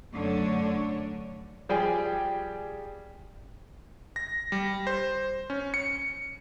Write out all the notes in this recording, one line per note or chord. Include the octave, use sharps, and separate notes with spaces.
F#2 D3 A3 D4 C#5
F3 G3 G4 G#4 G5 G#5
A#6
G3
C5
C#4
C#7